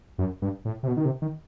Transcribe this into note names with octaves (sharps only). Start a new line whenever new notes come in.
F#2
G2
A2
C3
B2
D#3
C3
D#3